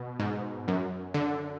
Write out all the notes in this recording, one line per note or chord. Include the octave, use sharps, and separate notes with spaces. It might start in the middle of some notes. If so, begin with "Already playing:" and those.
Already playing: B2
G#2
F#2
D3